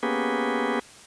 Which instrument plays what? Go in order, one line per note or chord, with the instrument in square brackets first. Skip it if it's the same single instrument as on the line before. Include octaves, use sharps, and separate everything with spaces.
[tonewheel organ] A#3 B3 C#4 G4 G#4 B4